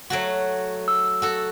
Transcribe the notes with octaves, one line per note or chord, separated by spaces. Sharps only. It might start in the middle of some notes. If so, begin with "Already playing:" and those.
F#3 A3 F#4
E6
F#4 A4